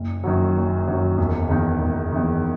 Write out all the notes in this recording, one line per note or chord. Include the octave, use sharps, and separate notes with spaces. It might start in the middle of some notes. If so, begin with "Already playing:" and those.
Already playing: F#1
F#2 D#3 F#3
F#1
F#2 D#3 F#3
E1
E2 D#3
E1
E2 D#3